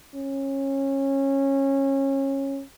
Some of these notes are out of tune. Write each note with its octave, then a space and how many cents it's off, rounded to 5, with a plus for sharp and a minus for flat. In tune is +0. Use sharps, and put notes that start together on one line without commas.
C#4 -25